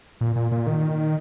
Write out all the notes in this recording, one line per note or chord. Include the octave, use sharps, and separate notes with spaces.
A#2
A#2
A#2
D#3